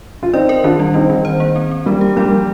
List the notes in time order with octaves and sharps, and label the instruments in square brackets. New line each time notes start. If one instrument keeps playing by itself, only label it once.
[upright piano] F4
[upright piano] C4 D#4 [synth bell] D5
[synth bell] A#4
[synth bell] D#3 [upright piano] D4 F4
[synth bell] G3
[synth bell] G3 [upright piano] C4 D#4
[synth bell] D#3
C5
A#3
C4
C4
[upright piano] G3 A#3 [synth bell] D4
[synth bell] G4
[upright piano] G3 A#3 [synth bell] D5
[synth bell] F3